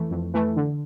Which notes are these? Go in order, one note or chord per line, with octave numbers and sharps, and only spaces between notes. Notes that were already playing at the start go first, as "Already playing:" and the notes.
Already playing: F2 E3 A3
F2
E3 A3
D3